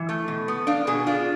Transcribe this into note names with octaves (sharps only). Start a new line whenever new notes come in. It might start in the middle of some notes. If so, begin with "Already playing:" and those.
Already playing: E3
A3
B2
B3
D4 F5
B2 G#4
D4 F4